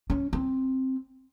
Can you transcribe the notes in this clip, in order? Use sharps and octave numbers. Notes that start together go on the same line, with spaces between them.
C#4
C4